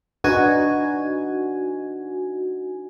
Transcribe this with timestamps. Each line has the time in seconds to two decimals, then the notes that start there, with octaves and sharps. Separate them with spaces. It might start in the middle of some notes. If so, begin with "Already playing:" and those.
0.24 D4 D#4 F#4 B4 G#5